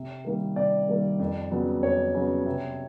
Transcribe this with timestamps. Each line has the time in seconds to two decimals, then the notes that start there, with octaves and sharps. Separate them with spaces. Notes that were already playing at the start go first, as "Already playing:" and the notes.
Already playing: C3
0.25 D#3 G3 A#3
0.56 C3 D5
0.88 D#3 G3 A#3
1.19 F2
1.51 C#3 F#3 B3
1.82 F2 C#5
2.14 C#3 F#3 B3
2.46 C3